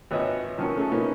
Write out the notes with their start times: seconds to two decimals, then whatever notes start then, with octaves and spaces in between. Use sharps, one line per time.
0.11 G#1 B4 C#5 D#5 E5
0.58 D#3 F3 F#3 A#3 C#4
0.76 A3 C#4 G#4 A4
0.92 A#3 B3 C#4 D#4 E4